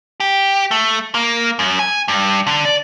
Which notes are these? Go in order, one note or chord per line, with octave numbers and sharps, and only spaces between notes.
G4
A3
A#3
F#2
G#5
G2
D3
D5